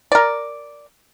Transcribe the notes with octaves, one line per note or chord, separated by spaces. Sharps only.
A#4 D5